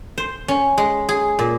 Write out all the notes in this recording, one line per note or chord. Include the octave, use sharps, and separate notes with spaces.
C5
C#4
G#3
G#4
A#2